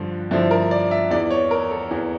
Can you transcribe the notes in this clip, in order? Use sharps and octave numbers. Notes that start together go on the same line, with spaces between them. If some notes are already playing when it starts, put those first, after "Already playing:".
Already playing: G2 D3 F3
G2 D3 F3 E4
A#4
D5
E5
E2 E3 D5
C#5
A#4
A4
E2 E3